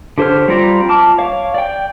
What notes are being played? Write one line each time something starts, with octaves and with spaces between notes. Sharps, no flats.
D3 G4 C5 C#5 F6
G3 C4 F4 D5 A#5
A5 D6 F6
C#5 F5
D5 G5